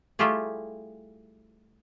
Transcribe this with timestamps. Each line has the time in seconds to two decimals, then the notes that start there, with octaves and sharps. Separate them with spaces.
0.19 G3 A3 E4 F4 G4 G#4